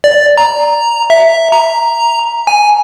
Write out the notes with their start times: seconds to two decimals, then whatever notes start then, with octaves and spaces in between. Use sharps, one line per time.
0.04 D5
0.38 A#5
1.10 E5
1.52 A#5
2.47 G#5